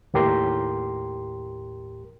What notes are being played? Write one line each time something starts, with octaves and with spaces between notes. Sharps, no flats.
D#2 A2 G4 A#4 C6